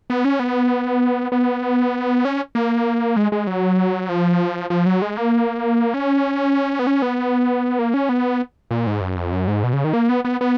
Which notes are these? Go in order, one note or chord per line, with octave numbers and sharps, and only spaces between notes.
B3
C#4
B3
B3
C#4
A#3
G#3
G#3
F#3
F3
F3
F#3
G#3
A#3
C#4
B3
C#4
B3
A#3
C#4
B3
A#2
G#2
F#2
F2
F#2
G#2
B2
C#3
D#3
A#3
B3
B3
B3